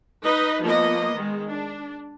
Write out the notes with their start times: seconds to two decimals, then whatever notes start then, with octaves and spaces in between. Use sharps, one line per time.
0.23 D#4 B4 D#5
0.62 F3 A#3 B3 D#5
1.13 D#3 G#3
1.49 D4